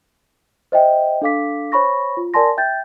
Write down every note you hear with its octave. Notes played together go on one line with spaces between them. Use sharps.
C5 D#5 E5 G5
D4 A4 F5 D6 B6
C5 C#5 B5 C#6 A#6
F4
A#4 D5 G#5 A5 C6 A#6
E5 G5 G6 A6